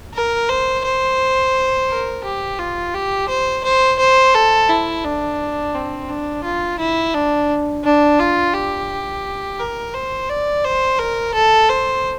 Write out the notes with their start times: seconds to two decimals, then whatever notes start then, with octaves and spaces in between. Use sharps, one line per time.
0.14 A#4
0.49 C5
0.84 C5
1.89 A#4
2.24 G4
2.59 F4
2.94 G4
3.29 C5
3.64 C5
3.99 C5
4.34 A4
4.69 E4
5.04 D4
5.74 C4
6.09 D4
6.44 F4
6.79 E4
7.14 D4
7.84 D4
8.19 F4
8.54 G4
9.59 A#4
9.94 C5
10.29 D5
10.64 C5
10.99 A#4
11.34 A4
11.70 C5